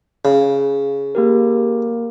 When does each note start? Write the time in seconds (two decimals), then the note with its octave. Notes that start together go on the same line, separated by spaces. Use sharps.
0.25 C#3
1.15 A#3 G4 A#4